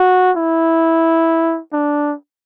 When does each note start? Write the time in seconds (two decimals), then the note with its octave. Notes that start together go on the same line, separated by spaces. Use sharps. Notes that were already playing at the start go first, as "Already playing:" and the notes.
Already playing: F#4
0.36 E4
1.73 D4